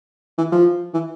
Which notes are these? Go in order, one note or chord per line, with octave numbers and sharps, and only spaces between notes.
E3
F3
E3